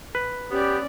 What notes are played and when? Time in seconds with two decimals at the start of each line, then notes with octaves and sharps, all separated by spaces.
0.15 B4
0.51 B3 C#4 G4 D5